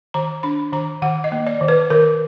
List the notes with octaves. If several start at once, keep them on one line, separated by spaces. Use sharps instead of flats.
D#3 A#5
D4 B5
D#3 A#5
D#3 F#5
D#5
A#3
D5
D#3
B4
D#3 A#4